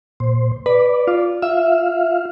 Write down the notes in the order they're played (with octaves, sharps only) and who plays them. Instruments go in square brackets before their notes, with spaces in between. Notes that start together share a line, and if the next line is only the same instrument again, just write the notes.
[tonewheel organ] A#2 C5
[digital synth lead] B4 [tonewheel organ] D5
[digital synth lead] F4
[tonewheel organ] F4 F5 [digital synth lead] E5